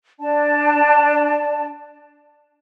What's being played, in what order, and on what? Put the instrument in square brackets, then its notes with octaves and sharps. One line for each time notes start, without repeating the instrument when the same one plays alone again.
[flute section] D4 D5 A5